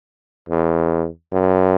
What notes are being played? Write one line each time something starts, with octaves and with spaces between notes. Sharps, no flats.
E2
F#2